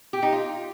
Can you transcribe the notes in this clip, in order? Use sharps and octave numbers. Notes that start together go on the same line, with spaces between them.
G4
D#4
F4